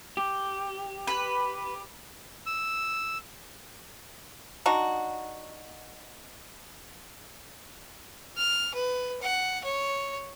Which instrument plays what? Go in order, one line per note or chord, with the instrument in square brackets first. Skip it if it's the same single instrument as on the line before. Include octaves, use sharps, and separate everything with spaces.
[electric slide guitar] G4
[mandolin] B4
[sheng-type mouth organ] E6
[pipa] D4 D#4 F#4
[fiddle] F6
B4
F#5
C#5